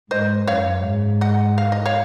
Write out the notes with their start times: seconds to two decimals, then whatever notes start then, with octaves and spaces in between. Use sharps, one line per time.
0.10 G#2 C5 D#5
0.48 F#2 C#5 F5
0.84 G#2
1.21 D#5 F#5
1.58 F5
1.72 D#5
1.86 C#5 F5